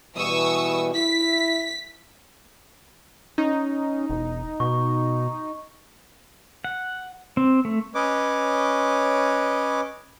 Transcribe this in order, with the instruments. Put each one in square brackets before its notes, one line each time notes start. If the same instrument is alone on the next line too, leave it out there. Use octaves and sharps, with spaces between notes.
[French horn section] B2 E3 G3 [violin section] C#6 D#6 E6
[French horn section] E4 [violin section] B6
[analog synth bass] C#4 [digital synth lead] D#4
[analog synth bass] E1
[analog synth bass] B2 [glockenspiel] C#6
[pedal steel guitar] F#5
C4
A3
[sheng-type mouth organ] C#4 B4 C#5 D#5 D6